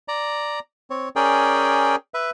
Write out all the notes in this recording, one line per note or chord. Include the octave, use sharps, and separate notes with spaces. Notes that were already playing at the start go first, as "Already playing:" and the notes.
D5 A#5
C4 C#5
C#4 G#4 A#4 D5 G5
B4 E5